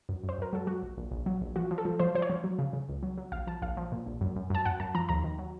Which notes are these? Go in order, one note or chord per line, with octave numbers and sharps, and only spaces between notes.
F#2
F#2
C5
F#2 A#4
F#3 A4
F#3 F#4
A#1
A#1
A#1
F#3
A#1
F3 F#4
F3
A4
F3
F3 C5
F3 C5
C#5
F3
F#3
C#3
C#3
C#2
F#3
F#3
A#1 F5
F3 A5
A#1 F5
F3
A#2
A#1
F#2
F#2
F#2 A5
F#2 F#5
F#2 A5
F3 A#5
D#2 A#5
D#3
F#3